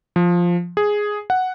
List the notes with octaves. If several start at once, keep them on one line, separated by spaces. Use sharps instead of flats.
F3
G#4
F#5